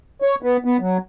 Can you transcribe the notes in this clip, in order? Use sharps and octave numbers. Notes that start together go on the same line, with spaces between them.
C#5
B3
B3
F#3